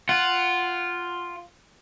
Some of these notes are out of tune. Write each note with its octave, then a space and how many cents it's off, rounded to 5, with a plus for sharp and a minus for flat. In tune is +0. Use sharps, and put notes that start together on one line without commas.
F4 +0 F#5 +5